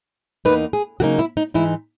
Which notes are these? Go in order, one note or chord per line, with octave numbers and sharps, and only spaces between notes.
E2 B2 A#3 D#4 B4
G#4
C#3 F#3 A#3 D#4 F#4
E4
D#4
G#2 E3 G#3 D#4 E4